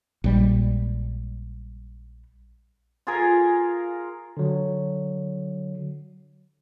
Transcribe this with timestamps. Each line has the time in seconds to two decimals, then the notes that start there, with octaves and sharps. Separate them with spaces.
0.24 A#1 G3 G#3
3.07 F4 G#4 A#4
4.37 D3 F#3